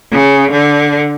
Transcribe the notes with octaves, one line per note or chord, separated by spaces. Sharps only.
C#3
D3